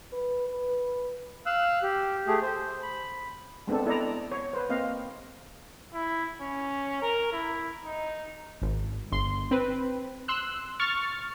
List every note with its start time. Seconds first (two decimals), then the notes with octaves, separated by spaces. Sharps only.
0.13 B4
0.49 B4
1.46 F5 E6 F#6
1.83 G4
2.27 A3 G4 G#4
2.42 C5
2.82 B5
3.68 G#3 B3 C4 D4 A4
3.86 E4 A4 D5 D#5 A#5
4.32 C#5
4.53 B4 C5
4.69 A#3 C4 D#5 F5
5.94 E4
6.41 C#4
7.02 A#4
7.33 E4
7.85 D#4
8.62 G#1
9.12 G1 C6
9.51 C4 B4
10.28 C6 E6 F#6
10.79 C#6 F6 A6